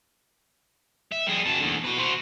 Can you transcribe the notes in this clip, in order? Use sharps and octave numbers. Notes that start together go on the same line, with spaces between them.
E5
G3 G#4
F#2 A5
E2 D3
F#4 B4
F#4 C5